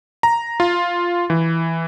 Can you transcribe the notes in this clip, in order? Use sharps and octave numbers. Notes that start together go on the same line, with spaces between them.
A#5
F4
E3